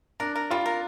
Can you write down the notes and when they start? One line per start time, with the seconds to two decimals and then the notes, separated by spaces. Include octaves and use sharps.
0.20 D4 A#4
0.36 A#4
0.50 G3 F4
0.66 A#4